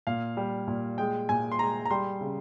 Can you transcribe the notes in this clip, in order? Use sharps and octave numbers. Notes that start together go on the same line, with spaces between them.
A#2 F5
G3
A#2
G#3 G5
A#2 G#5
C6
G#3 A#5
A#5
G3 C6
C#3